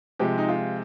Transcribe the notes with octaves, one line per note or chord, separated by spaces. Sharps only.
C3 F3 G#3 G4
D#4
F4